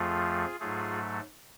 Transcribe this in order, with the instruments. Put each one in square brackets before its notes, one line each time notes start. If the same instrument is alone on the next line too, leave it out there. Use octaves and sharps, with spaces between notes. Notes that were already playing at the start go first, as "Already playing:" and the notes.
Already playing: [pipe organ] F2 F3 A3 F4 G#4
G#2 F#3 A3 F4 G#4